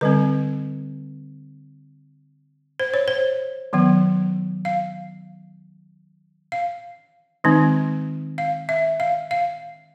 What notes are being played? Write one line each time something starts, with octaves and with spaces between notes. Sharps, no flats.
D3 G3 C4 B4
C5
C#5
C5
D#3 F#3 B3
F5
F5
D#3 G#3 C4 D#4
F5
E5
F5
F5